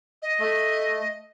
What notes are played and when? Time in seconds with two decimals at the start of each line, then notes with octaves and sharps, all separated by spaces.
0.22 D#5
0.41 A3